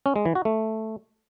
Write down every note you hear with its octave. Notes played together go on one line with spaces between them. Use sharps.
C#4
G#3
E3
F#4
A3